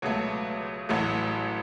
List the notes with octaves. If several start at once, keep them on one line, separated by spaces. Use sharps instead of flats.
C#2 B2 F#3 A3 C#5
A1 A2 F#3 A3